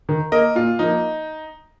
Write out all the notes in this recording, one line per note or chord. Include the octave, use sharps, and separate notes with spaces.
D#3
A#3 A#4 D#5
A#2 F4
F3 A#3 D#4